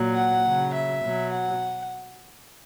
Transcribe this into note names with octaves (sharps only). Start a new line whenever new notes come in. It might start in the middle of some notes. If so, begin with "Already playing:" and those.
Already playing: A#2 F#3
F#5
C#3 F#3
E5
B2 F#3
F#5